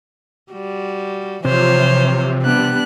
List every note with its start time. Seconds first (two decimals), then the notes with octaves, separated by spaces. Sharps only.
0.52 G3 F#4
1.45 C3 E3 F3 F4 C5 C#5
2.43 G3 B3 D4 F#6